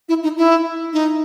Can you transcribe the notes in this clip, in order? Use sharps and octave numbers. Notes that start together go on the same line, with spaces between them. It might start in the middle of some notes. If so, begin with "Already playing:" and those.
E4
D#4
E4
D#4